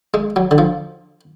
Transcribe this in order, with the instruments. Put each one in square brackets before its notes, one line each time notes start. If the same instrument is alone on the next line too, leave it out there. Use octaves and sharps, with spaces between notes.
[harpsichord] G#3
F#3
D3
F3